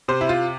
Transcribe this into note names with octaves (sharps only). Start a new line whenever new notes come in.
C3 C5
E4
F4